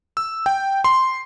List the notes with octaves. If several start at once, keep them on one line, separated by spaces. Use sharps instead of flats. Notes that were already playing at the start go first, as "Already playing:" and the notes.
E6
G5
C6